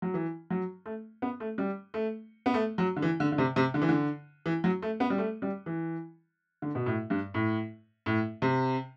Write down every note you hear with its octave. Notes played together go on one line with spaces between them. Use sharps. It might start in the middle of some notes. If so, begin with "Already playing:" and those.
F#3
E3
F#3
A3
B3
A3
G3
A3
B3
A3
F#3
D3
E3
D3
D3
C3
C3
D3
E3
D3
E3
F#3
A3
B3
G3
A3
G3
E3
D3
B2
A2
G2
A2
A2
C3